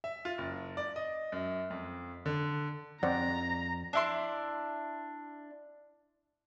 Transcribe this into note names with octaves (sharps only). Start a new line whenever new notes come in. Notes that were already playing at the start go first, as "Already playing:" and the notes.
E5
F4
F#1
D5
D#5
F#2
F2
D3
F2 C5 D5 F#5 A#5
D4 E4 C6